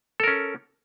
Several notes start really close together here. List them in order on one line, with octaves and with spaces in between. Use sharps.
A4 A#4 C#4